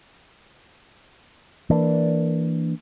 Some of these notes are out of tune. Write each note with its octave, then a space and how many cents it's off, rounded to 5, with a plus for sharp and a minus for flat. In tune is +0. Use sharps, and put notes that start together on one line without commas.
E3 +0 A#3 -10 D4 +0